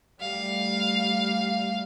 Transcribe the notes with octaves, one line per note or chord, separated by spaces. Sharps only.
G3 A3 F5